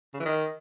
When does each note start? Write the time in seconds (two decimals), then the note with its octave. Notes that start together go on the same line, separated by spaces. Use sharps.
0.14 C#3
0.20 E3
0.25 D#3